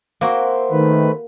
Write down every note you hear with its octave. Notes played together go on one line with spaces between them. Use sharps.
A#3 C4 E4 F#4 C5
D#3 A3 B4